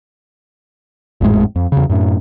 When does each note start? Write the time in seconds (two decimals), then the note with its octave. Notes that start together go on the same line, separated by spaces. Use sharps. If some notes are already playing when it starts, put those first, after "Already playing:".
1.21 G#1 F2 A2 G#3
1.56 F2
1.72 E2 C#3
1.90 F#2 A2